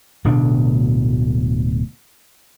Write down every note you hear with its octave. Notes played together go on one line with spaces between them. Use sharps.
D1 D2 B2 D4